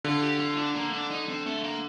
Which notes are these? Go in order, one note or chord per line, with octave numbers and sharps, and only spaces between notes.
D3 F4
G4
F4
D4
A#3
D4
D#4
C4
A3
A#3